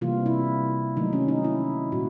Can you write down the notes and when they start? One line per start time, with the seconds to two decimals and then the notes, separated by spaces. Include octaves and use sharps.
0.01 C3 E3 G3 A#3 F4
0.26 E4
0.97 D#3 F#3 A3 D#4
1.13 C#4
1.28 D#4
1.44 E4
1.92 A#2 G3 F#4